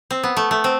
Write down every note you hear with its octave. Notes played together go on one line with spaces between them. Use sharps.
C4
B3
A3
A3
C4